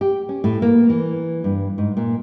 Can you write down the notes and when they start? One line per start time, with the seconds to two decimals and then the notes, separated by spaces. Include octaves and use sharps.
0.01 G4
0.29 C#4
0.44 A2
0.62 A#3
0.90 E3
1.44 G2
1.78 G#2
1.97 A#2